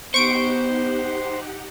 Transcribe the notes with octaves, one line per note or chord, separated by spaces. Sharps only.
B3 D#4 G4 C5 F#5 C#6 D7